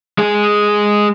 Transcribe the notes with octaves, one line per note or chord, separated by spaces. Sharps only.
G#3 G#4